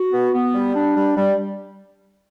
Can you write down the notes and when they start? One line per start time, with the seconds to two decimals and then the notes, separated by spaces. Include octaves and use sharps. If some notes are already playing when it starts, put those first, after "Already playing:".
Already playing: F#4
0.13 B3
0.34 B3
0.55 G3
0.75 D4
0.96 G3
1.17 G3